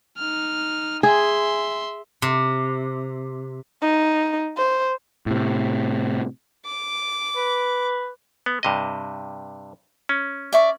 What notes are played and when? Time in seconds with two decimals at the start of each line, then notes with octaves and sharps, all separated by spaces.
0.18 D#4 F6
1.03 G#4 E5 C6
2.22 C3
3.82 D#4
4.57 C5
5.26 A2 C3
6.66 D6
7.36 B4
8.46 B3
8.63 G2 C3 D#5
10.09 C#4
10.52 D5 E5 C#6